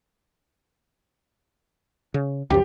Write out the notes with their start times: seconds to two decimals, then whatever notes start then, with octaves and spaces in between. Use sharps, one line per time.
2.14 C#3
2.50 C#2 F#2 F3 G4